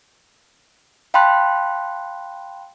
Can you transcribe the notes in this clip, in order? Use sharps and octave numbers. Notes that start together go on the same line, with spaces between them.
F5 G5 A5 B5 C6 F#6